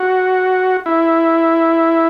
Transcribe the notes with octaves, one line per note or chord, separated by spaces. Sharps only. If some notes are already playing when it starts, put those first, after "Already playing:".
Already playing: F#4
E4